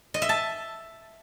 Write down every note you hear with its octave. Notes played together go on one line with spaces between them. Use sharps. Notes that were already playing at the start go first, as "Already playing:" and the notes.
D#5
E5
A5